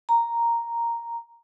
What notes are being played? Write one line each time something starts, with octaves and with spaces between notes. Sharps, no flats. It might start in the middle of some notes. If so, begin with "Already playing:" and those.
A#5